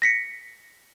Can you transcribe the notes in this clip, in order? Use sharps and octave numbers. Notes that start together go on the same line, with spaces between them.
A#6 B6 C#7